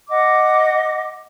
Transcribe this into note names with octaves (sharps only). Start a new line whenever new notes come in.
D#5 F#5 D6